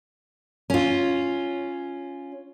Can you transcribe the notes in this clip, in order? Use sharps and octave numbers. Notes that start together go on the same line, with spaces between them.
C#4 F4